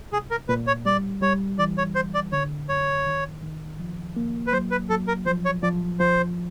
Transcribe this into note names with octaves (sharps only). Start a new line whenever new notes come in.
C2 G#4
A#4
A#2 B4
C#5
G3 D5
G3 C#5
E3 D5
C#5
D2 C5
D5
D3 C#5
F#2 C#5
D#3
D#3
F3
A#3
B4
F#3 C5
B4
F#3 A4
A#4
F3 C5
C#5
F3 D5
F3 C5